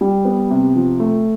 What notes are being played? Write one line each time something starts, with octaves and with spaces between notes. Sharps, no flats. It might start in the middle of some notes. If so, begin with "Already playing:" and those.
G3
B3
C3
F3
A3